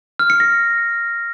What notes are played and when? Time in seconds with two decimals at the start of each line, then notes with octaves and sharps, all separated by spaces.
0.19 F6
0.30 C#7
0.40 A#6